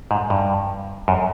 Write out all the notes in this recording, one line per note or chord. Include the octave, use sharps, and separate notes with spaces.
G#2
G2
F#2